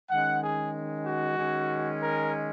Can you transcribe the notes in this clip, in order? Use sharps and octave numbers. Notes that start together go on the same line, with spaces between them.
D#3 G#3 C#4 F#5
G#4
F#4
D#3 G#3 C#4
A#4